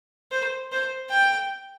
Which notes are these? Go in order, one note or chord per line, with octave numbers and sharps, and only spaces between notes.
C5
C5
G5